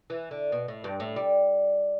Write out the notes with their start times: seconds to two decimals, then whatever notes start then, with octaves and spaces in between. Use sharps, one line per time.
0.10 E3
0.31 D3
0.52 B2
0.68 A2
0.84 G2
1.00 A2
1.16 G3